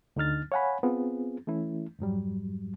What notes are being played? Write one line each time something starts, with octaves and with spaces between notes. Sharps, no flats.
D2 D3 D#4 F6 A6
C#5 F5 F#5 G#5 B5
B3 C4 F4 G#4
E3 A3 C#4 E4
F2 G#2 F#3 G3